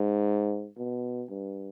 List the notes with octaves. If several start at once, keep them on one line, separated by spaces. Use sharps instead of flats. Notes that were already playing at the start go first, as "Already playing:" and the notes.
Already playing: G#2
B2
G2